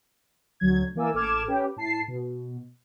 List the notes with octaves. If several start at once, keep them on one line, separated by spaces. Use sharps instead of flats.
D2 F#3 G#6
E3 A#3 D5 G#5 E6
A1 A4 D6 F6 G#6 E7
C#4 G4 B4
A2 A5 C7
B2